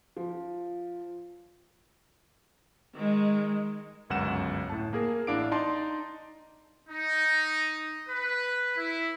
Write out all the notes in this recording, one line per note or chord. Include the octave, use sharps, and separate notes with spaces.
F3
D#3 G#3
G1 C#2 F#2 F#5 E7
A2 A5
A#3 G#4 A#4
A1 D4 E4 F5 D6 D7
D#4 D5 A5 C6
D#4
B4
E4